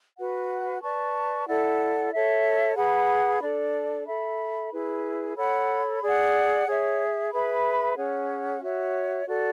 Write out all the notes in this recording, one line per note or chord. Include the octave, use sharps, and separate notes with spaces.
F#4 B4 F#5
B4 D5 A5 C#6
E4 A4 D5 F#5
A4 C#5 E5
G#4 B4 F#5 B5
D4 A4 D5
A4 E5 B5
E4 G#4 B4
A4 C#5 F#5 B5
G#4 D5 F#5
G#4 C#5 E5
G#4 B4 E5 B5
C#4 G#4 C#5 F#5
F#4 C#5 E5
F#4 A4 D5